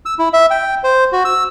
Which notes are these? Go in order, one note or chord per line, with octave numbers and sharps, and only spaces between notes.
E6
E4
E5
G5
C5
F#4
E6